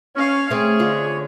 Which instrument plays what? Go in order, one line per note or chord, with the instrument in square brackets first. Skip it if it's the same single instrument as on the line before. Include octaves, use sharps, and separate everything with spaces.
[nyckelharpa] C#4 F5 [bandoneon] C#5 [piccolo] F6
[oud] A3 C4 [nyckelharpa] G#4
[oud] D3 F4